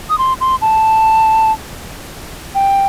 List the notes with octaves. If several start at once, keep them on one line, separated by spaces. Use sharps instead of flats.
D#6
C6
C6
A5
G5